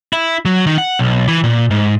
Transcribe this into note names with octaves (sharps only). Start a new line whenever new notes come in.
E4
F#3
D#3
F#5
B1
E3
A#2
G#2